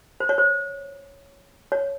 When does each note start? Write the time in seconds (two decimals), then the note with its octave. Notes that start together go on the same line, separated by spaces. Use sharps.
0.20 C5
0.29 C#5
0.38 C5
1.72 C#5